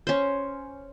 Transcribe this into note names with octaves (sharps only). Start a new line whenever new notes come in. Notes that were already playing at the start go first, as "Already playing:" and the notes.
C#4 C5